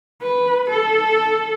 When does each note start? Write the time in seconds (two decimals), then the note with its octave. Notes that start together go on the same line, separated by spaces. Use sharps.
0.22 B4
0.70 A4